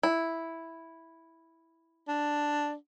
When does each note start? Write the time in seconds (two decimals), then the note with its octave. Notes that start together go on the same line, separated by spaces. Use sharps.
0.03 E4
2.08 D4